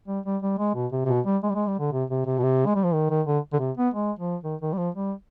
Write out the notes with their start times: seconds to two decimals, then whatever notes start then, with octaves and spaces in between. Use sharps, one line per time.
0.08 G3
0.26 G3
0.42 G3
0.59 G#3
0.75 B2
0.92 C3
1.05 C3
1.09 B2
1.26 G3
1.43 G#3
1.50 G3
1.56 G#3
1.67 G3
1.80 D3
1.93 C3
2.10 C3
2.26 C3
2.39 B2
2.43 C3
2.66 G#3
2.75 G3
2.84 F3
2.94 D#3
3.10 D#3
3.27 D3
3.53 D3
3.60 C3
3.77 B3
3.94 G#3
4.19 F3
4.44 D#3
4.61 D#3
4.73 G3
4.78 F3
4.95 G3